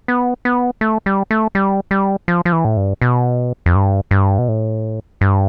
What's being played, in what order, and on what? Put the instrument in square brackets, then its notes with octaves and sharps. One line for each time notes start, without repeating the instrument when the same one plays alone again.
[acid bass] B3
B3
A3
G3
A3
G3
G3
F3
F3
E3
A2
G2
B2
F2
G2
G2
B2
A2
G2